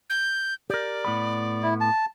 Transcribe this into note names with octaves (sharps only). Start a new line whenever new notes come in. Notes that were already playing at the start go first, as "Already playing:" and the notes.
G6
G4 A#4 D5
A2 B3 B5
E4
A5